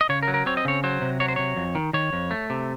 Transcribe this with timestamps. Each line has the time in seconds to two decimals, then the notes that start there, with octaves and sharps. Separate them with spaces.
0.01 D#5
0.09 C#3 C#5
0.23 A#4
0.28 F#3
0.34 A#4
0.46 C4 C#5
0.57 D#5
0.65 C#3 C#5
0.84 F#3 C5
1.01 C3
1.20 F#3 C#5
1.28 C5
1.36 C3 C#5
1.57 F2
1.75 D#3
1.93 D#3 C#5
2.13 F2
2.31 A3
2.50 C3